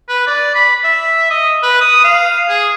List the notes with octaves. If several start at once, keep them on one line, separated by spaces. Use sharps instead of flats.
B4
D5
B5
E5
D#5
B4
D#6
F5
G#4